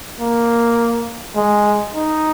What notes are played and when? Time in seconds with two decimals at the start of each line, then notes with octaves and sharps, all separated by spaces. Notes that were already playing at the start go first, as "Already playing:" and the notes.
0.20 A#3
1.36 G#3
1.94 D#4